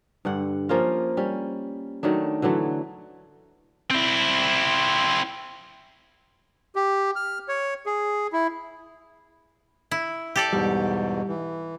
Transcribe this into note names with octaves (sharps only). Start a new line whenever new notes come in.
G2 D3 F#5
F3 A#3 C#4 F4
G3 C#4
D#3 F#3 A3 D4
D3 E3 F#3 A3
C4 E4
G4
F6
C#5
G#4
E4
E4
G4 A4 D5
E2 G#2 B2 G3
E3